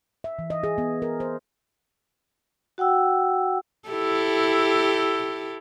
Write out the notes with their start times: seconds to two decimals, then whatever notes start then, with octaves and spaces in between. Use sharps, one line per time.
0.24 E5
0.39 E3
0.50 D#5
0.63 G#4
0.78 B3
1.02 A#4
1.20 C5
2.78 F#4 F#5 G5 E6
3.88 E4 G4 A4